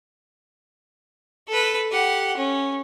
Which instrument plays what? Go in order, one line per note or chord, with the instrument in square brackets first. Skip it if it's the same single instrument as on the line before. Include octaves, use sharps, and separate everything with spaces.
[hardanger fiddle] A4 B4
G4 F#5
C#4